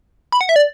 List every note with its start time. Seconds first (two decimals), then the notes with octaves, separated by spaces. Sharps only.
0.32 B5
0.41 F#5
0.49 E5
0.56 D5